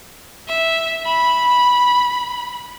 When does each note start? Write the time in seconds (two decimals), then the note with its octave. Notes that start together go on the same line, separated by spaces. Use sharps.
0.49 E5
1.06 B5